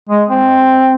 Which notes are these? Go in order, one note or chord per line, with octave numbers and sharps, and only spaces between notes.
G#3
C4